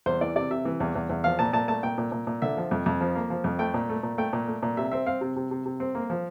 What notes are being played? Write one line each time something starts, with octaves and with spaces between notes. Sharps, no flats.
E2 C5
E3 D5
C3 D5
C3 E5
E3
E2
E2
E2
F3 F5
A#2 A5
A#2 A5
A3 A5
A#2 G5
A#2
A#2
A#2
D3 E5
F3
F2
F2
F3
A#3
F3
F2
A3 G5
A#2
A3
A#2
A3 G5
A#2
A3
A#2
C3 E5
C4 E5
C4 F5
C3
C3
C3
C3
C4
A#3
F3